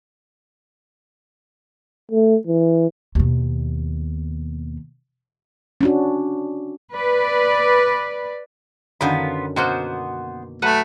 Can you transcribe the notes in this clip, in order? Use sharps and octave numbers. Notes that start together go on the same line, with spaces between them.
A3
E3
D#2 B2
C#4 D4 F#4
B4 D5
F#2 D3 D#3 B3 F4 B5
B2 A#3 B3 F#4 C5 G6
F#3 A3 B4 F#5